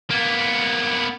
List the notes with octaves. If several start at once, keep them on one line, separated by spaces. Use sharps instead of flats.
A#3 B3